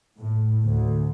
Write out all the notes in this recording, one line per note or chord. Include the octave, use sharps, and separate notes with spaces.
A2
D2